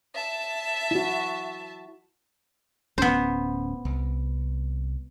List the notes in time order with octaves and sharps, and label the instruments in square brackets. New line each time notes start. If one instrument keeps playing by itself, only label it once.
[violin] E5 A5
[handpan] E4 F#4
[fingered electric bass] D1 C#4 [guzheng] B3 C5
[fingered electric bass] C2